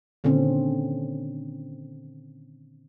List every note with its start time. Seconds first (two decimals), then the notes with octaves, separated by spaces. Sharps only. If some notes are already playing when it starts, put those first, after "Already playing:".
0.24 A#2 D3 D#3 C4 C#4